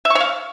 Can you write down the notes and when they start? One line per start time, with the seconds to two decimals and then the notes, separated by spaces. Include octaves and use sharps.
0.05 E5
0.10 C#6
0.15 C#5
0.21 F5